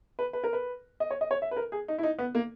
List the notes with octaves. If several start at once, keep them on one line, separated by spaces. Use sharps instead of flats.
B4
B4
A#4
B4
D#5
C#5
D#5
C#5
E5
B4
A#4
G#4
D#4
E4
D#4
B3
A#3